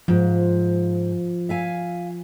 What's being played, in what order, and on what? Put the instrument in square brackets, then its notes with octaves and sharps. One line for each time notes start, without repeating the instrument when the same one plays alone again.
[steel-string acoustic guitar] G#2 [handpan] F3 F4
[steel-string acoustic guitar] E5 F5 G#5